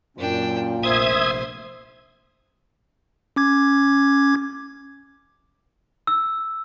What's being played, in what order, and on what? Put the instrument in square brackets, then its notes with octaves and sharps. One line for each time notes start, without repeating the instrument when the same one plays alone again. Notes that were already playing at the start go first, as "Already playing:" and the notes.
[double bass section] F#2 [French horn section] A#2 [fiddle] D4 G5
[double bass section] F1 A#1 [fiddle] C5 [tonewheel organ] E5 D#6 G#6
[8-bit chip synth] C#4 D6 G#6
[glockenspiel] E6